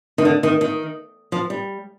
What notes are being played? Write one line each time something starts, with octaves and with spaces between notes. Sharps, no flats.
D#3
D3
D#3
D#3
F3
G3